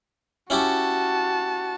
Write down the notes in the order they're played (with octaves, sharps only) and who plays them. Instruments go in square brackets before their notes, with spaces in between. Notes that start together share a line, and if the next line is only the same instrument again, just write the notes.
[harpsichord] C#4 E4 G4 [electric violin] F#4 A5